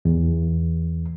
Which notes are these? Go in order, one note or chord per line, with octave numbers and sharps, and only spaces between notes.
E2